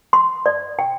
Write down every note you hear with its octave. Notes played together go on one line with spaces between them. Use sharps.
C6
D5
G5